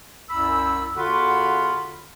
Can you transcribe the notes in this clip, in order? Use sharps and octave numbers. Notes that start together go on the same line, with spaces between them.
C2 F#2 B5 E6
E2 D3 F4 F#4 F#5 B5